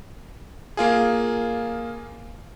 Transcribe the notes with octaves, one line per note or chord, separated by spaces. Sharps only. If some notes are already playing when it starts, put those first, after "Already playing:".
A#3 F4 G#4